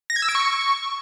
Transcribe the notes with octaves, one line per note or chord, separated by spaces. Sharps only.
A#6
G#6
E6
D7
C#6